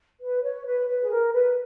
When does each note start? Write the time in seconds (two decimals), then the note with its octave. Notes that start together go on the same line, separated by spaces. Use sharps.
0.21 B4
0.43 C#5
0.65 B4
0.88 B4
1.02 G#4
1.11 A#4
1.33 B4